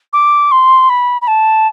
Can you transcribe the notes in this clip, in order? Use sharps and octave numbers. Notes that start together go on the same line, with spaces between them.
D6
C6
B5
B5
A5